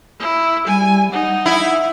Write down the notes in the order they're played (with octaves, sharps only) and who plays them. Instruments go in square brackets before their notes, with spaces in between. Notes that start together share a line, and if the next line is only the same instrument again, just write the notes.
[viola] E4
[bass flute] G3 [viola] G#5
[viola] D#4 [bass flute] F#5
[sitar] E4